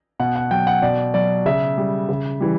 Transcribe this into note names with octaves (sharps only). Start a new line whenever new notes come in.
B2 F#5
F#5
F#3 G5
F#5
B2 D5
F#3 D5
C#3 E5
G3
C#3
E3 G3